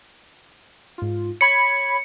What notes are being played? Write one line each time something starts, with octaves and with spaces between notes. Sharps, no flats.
G#2 F4
C#5 B5 G#6 C#7